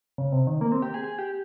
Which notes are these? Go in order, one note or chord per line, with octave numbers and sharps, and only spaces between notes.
C#3
C3
D#3
A#3
C4
G4
G#4
G#4
G4